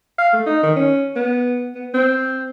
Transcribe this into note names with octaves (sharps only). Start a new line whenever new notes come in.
F5
A3
D#4
D#3
C#4
B3
B3
C4